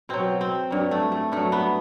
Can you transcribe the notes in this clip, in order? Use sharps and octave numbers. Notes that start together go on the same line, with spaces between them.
B2 F#3 C4
C4
G2 F#3
A3
A3
G2 F#3 A3
B3